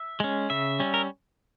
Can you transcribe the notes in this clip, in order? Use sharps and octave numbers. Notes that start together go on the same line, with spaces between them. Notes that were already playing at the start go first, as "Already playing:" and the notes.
Already playing: E5
G#3 C#4
C#3 E5
G3 C#4
A#4